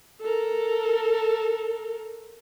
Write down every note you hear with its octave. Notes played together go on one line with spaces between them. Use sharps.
A4 A#4